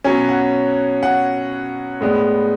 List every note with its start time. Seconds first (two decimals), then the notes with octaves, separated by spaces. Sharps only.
0.04 B2 F#3 C#4 G#5
0.29 F#5
1.03 F#5
2.01 A2 G#3 B3 D4